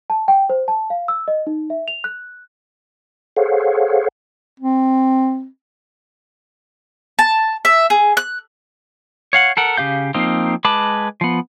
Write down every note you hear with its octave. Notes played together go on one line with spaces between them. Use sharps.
A5
G5
C5
A5
F5
E6
D#5
D#4
E5
F7
F#6
G#4 A4 C5 C#5 F5 F#5
C4
A5
E5
G#4
F#6
C#5 F5 F#5
A4 A#4 F#5
C#3 G4 F5 G6
F3 A#3 C4 D#4 F5
G#3 B4 A5 B5 D6
F3 B3